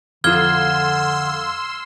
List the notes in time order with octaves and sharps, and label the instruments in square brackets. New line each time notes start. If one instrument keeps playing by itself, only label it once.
[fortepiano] F2 F4 [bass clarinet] D3 [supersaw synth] C6 E6 [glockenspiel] F6 G#6 G7